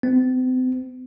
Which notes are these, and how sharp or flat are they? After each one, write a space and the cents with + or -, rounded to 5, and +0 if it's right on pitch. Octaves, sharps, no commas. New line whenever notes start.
C4 -40